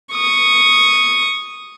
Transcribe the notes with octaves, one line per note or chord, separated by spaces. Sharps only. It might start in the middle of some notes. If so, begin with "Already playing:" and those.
C#6 D#6